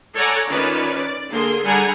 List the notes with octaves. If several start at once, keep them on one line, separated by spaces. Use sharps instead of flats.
A4 C#5 D5 F#5 G#5 A#5
D#3 C#4 F4 B4 D5
D5
D3 A#3 G#4 C6
D3 G3 G#4 F#5 G#5 A#5